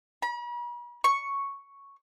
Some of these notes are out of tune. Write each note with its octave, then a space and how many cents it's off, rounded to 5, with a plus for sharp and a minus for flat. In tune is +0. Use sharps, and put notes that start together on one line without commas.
B5 -45
C#6 +0